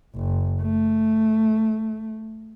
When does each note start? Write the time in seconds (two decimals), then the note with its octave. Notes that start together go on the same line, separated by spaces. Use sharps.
0.16 F#1
0.61 A3